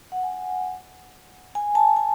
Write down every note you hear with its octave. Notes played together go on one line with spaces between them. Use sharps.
F#5
G#5
G#5
A5
G#5